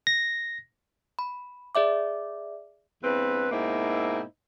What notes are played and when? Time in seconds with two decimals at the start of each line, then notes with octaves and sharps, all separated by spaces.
0.07 A#6
1.19 B5
1.75 G#4 D5 E5 D6
3.03 E2 G2 C4 B4
3.51 G#2 B2 A#3 C4 D#4 E4